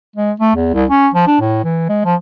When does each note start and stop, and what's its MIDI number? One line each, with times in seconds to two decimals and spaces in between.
0.16 0.32 56
0.40 0.55 57
0.55 0.71 40
0.74 0.85 36
0.90 1.08 61
1.14 1.27 53
1.27 1.40 62
1.41 1.63 45
1.64 1.86 52
1.89 2.04 56
2.05 2.15 53